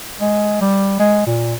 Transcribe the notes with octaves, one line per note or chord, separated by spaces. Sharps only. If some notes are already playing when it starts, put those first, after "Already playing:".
G#3
G3
G#3
A#2